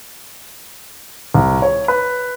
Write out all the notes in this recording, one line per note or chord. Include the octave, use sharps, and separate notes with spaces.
C2
C#5
B4